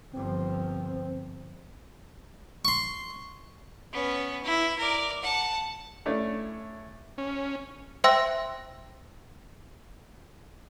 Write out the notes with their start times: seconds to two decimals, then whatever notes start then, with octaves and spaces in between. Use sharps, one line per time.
0.13 G1 F3 C4
2.65 C6 C#6
3.93 B3 C#4
4.43 E4
4.79 A#4 D5
5.23 F#5 A5
6.06 A3 C#4 D4 E4
7.18 C#4
8.04 C5 E5 G5 C6 E6 A#6